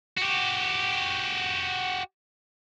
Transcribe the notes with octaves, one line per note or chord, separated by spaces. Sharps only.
F#4 G4